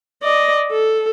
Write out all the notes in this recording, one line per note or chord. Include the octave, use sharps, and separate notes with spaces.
D5 D#5
A4